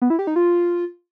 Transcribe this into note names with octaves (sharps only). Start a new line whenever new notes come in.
B3
E4
G4
D#4
F4